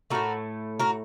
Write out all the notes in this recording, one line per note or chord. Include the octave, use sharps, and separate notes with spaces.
A2 A3 F#4 A#4
F#4 A#4